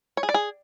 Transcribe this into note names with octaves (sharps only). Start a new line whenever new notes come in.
C#5
G#4
D5
G#4